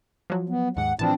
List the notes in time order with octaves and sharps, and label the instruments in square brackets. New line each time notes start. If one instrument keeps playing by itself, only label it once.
[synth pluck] F3 F#3
[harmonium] B3
[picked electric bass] D#2 G#2 [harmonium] F#5
[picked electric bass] A2 E3 F3 [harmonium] C4 D4 [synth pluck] A5